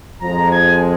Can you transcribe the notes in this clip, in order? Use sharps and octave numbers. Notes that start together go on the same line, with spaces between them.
F2 F3 G#3 A#5
G#5